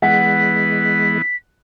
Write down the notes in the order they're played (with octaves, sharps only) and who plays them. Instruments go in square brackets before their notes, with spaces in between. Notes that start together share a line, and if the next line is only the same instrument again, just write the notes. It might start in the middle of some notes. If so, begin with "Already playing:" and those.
[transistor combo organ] E3 B3 [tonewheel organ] G#3 [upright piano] F#5 [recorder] B6